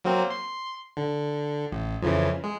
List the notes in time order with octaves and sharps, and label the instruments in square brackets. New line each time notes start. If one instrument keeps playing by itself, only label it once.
[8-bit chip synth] F#3 A#3 C4
C6
D3
A1
F2 C#3 E3
G#3